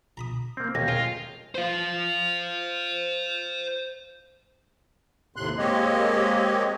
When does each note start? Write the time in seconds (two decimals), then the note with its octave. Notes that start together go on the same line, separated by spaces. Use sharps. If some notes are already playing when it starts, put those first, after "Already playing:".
0.17 A#5 B5 D#6
0.57 A#3 C4
0.75 D#2 B2 A3 C#4 A#6
0.88 F4 G#4 A#4 D#5 G5
1.55 C5 F5
5.36 D#2 A2 C3 C6 F#6
5.58 G#3 A#3 C4 G4 C#5 D#5